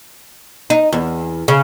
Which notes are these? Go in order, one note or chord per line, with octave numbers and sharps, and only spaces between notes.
D#4
E2
C#3